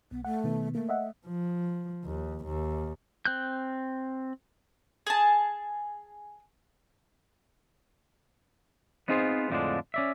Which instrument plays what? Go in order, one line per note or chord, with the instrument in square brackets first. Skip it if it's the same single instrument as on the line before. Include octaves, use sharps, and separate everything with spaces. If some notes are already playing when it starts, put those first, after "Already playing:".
[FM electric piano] B1 [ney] B3
[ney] A3 [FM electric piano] F#5
[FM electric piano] B2 D#3 B3
[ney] A3 [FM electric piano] A#3
[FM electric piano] D#5 E5 F#5
[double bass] F3
D#2
D#2
[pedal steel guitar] C4 F#6 G6
[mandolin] G#4 A5
[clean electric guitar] B3 C4 D#4 F4 G#4 C5
F2 A2 D3 F3 G#3 D4
C#4 D5 E5